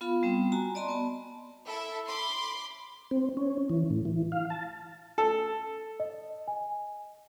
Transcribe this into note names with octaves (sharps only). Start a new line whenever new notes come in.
B3 F4 F5 B5
G3 B3 C4
F#4 G#5 A#5
D5 D#5 A5 A#5 C6
B3 A5
E4 A4 E5
B5 C6 D6
C4
C#4
E3
A2
E3
F5
A5
A4
D#5
G#5